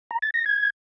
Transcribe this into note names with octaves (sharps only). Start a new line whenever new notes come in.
A#5
A6
A#6
G#6